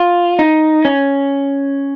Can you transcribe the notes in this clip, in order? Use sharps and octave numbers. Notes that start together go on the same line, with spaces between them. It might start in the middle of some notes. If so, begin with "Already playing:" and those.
Already playing: F4
D#4
C#4